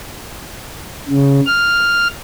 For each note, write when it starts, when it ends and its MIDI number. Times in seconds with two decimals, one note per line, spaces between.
1.09 1.41 49
1.46 2.07 89